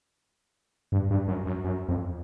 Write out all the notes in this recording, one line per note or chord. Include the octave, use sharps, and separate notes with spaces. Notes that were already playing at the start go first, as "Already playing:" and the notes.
G2
G2
F#2
F#2
F#2
F2